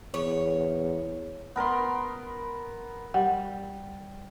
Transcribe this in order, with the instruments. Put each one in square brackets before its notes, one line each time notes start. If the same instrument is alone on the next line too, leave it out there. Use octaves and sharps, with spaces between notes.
[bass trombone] E2 [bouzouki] C#5
[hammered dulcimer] B3 A#4 B5 C6
[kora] G3 [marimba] F#5